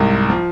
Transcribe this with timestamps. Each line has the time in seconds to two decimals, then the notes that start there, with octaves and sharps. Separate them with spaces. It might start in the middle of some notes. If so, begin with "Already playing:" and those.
Already playing: C2 G#2
0.30 F3